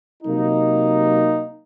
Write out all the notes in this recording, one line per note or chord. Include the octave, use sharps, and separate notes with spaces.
C3 F#3 A#3 D#4